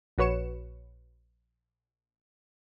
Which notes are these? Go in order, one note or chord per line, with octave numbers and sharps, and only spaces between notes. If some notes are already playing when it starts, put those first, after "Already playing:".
A#1 F#4 B4 C#5 C#7 E7